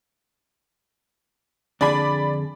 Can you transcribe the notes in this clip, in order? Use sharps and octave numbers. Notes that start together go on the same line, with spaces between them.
F2 D3 G#4 D5 B5